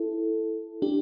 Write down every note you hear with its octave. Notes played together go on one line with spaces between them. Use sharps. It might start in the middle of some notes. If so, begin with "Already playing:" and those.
Already playing: E4 A4
D4 G4